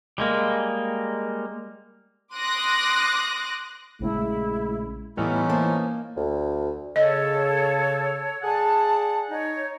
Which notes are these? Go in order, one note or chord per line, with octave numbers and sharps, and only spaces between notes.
G3 G#3 A#3
C6 D6 D#6 F#6 A#6
A#1 C#3 G#3 A3 E4
A2 E3 G3 B3 C#4 D#4 F6
A#3 C5 A5
D2
C#3 A4 C#5 D#5
G#4 D5 F#5 A5
D#4 C#5